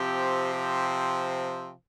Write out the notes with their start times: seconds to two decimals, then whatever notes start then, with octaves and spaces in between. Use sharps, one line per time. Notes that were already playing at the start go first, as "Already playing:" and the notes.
Already playing: C3 F3 C4 G4
0.53 G4